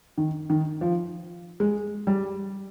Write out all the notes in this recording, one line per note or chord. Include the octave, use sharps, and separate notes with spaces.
D#3
D#3
F3
G#3
G3